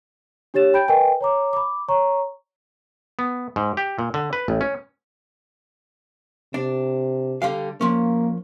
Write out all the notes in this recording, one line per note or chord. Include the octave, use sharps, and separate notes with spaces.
D4 G4 C#5 A6 E7
G5 B5 G6 D7
A#4 B4 D#5 G5 G#5
C#5 A#5 D6
B5 D6
C#5 A#5 C#6
B3
G#2
G4
A#2
D3
B4
A1
C#4
C3 D4
D3 G3 F5
F3 A#3 C#4